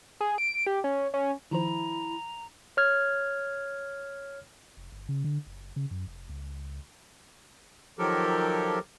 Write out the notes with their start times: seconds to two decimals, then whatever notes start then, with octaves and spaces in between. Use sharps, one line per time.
0.21 G#4
0.38 D7
0.67 G4
0.84 C#4
1.14 C#4
1.51 D#3 F3 E4 C5 A#5
2.77 C#5 F6 G#6
4.77 F1
4.92 G1
5.09 C#3
5.24 D3
5.46 F#1
5.76 C#3
5.91 F#2
6.07 F1
6.29 C#2
7.99 D#3 F3 F#3 G4 A4 A#4